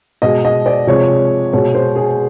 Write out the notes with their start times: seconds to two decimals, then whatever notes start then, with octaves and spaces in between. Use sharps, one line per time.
0.22 B2 G#3 D#5
0.45 D#5
0.66 D5
0.87 C3 F3 G#3 C#5
1.53 B2 G#3 C#5
1.75 C5
1.96 G#4